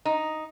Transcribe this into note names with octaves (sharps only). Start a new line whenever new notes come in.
D#4